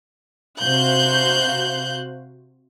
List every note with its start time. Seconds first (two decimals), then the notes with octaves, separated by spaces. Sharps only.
0.60 C3 F#4 C5 F5 F#6 G6